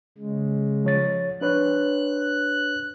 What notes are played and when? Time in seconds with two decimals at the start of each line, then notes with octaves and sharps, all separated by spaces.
0.18 C#3 G#3
0.85 F3 C#5 A6
1.41 D4 B4 C#5 F#6